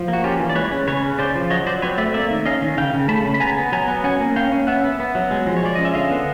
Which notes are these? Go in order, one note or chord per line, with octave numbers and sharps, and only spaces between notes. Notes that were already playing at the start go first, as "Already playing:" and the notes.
Already playing: F3
A#3
F#4
C#4 F4 G4
E3
D5
G#3 B4 C#5
C#4
C#3 B4 C#5
C#4
C#3 C5 D5
F3
F#3 C#5 D#5
F#3 C5 D5
C4 B4 C#5
A3 D5 E5
A#3 D5 E5
D#3
C#4 D#5 F5
D#3
C#3 F5 G5
C#3
A3 A5 B5
C#3
B5
B3 G#5 A#5
B3
F#3 G#5 A#5
B3
C#4 F#5 G#5
A#3
C#4 F5 G5
C#4
B3 E5 F#5
B3
B3
F#3
G#3
F3
C#5
G#3 D5
C#4 D#5
E5
D3 D#5 F5
B3